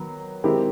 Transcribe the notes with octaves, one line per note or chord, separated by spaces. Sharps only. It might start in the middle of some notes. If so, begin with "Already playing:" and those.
Already playing: D#3 F#3 B3
D#3 G#3 C4 E4 G4